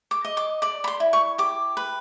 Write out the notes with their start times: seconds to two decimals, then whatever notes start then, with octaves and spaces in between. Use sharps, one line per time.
0.11 D6
0.25 D#5
0.37 D6
0.62 D5 D6
0.84 B5
0.88 C6
1.00 E4
1.13 C#6
1.38 G4 D6
1.77 B4